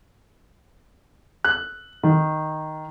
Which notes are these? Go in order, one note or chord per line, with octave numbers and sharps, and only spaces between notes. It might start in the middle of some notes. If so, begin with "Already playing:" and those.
F#6
D#3